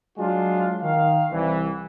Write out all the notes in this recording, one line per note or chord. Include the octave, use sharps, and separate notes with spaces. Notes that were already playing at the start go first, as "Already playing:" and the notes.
F#3 G#3 D4 F4
D#3 F5
C2 E3